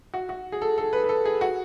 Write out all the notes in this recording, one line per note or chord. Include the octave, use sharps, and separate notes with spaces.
F#4
F#4
G#4
A4
A4
B4
B4
A4
G#4
F#4